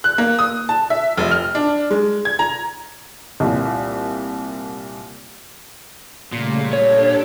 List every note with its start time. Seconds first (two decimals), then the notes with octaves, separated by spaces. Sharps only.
0.04 F#6
0.18 A#3
0.39 D#6
0.69 A5
0.90 E5
1.17 F1
1.31 F6
1.55 D4
1.91 G#3
2.25 G#6
2.39 A#5
3.40 C2 A#2
6.32 A#2 C#3 G3 A3
6.73 D4 G4 A4 C#5